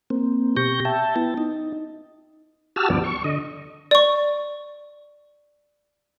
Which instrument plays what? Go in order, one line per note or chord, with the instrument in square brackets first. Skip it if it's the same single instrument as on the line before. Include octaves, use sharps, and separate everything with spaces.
[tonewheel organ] A#3 C4
B2 G4 C#6 G6 A#6
E5 G5 A5
B3 E4 A5
D#4
F#4 G4 A5 E6 F6
D2 G2 F3 B3 D5
C#6
D3 D#5
[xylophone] D5 C#6